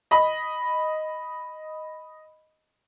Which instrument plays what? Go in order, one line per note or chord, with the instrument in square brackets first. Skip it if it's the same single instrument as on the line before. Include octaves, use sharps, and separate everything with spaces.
[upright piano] D#5 B5